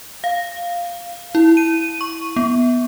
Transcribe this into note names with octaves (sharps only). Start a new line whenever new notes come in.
F5
E4
D#7
C#6
B3